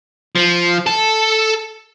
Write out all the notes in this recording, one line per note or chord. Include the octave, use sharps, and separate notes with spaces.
F3
A4